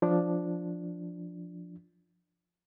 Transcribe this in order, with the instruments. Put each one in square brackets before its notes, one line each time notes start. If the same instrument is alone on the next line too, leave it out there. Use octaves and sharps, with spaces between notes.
[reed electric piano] F3 D4